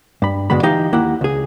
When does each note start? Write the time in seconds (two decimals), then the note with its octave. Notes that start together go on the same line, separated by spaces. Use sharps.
0.22 G2 B5
0.50 G2 B2 D3 G#3 B5
0.63 E3 D#4 G4 D#5 F5 G5
0.93 D#2 A#3 E4 F#5
1.21 C#2 G#4